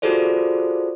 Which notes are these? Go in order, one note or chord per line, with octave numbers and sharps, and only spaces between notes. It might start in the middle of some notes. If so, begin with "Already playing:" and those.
F4 F#4 G#4 A4 C5 D5